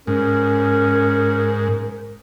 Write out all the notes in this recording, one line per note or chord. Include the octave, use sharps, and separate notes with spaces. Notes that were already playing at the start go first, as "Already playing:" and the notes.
G#2 C#4 A#4